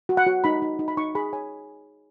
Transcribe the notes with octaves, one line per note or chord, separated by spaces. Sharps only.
F#4
F#5
F#4
D#4 B5
D#4
D#4
B5
D#4 C#6
G#4 B5
C#5 G#5